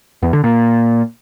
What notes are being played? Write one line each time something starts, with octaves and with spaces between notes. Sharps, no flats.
E2
D3
A#2